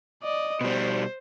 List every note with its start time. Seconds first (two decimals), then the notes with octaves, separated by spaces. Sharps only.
0.23 D5 D#5
0.61 B2 G3 C5